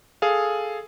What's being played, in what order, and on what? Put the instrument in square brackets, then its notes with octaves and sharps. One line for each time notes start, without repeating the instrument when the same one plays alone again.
[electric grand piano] G#4 A4 F5